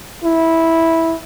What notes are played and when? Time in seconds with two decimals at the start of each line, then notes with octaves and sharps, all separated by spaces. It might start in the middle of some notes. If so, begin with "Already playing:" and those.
0.23 E4